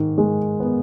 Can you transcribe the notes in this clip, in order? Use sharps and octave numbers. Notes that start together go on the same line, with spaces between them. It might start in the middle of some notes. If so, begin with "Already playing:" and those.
Already playing: G#2 D#3
G#3
B3